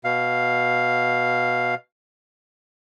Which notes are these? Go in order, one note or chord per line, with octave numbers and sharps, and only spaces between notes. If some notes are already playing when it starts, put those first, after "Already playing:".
B2 F5